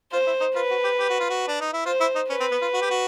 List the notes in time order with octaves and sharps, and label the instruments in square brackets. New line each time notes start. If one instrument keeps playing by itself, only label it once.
[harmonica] F4 [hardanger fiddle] C5
[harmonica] E4
D#4
[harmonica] F4 [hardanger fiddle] B4
[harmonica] F#4
G4
G4
F#4
F4
F#4
D4
D#4
E4
[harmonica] F4 [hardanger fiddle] C5
[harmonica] E4
D#4
[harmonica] C#4 [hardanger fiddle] B4
[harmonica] C4
B3
F4
F#4
G4
F#4